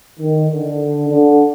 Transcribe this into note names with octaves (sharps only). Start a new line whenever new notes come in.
D#3
D3
D3